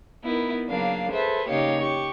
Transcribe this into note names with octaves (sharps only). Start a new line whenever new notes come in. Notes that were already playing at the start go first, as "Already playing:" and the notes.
B3 D#4 E4 A#4
C#3 F#3 A#3 D4 F5
G#4 A4 B4 C5 E5
C#3 A#3 D#4 G4 C#5 F5
G4 C#6